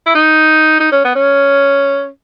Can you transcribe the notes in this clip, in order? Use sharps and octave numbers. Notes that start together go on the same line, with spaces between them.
E4
D#4
D#4
C#4
B3
C#4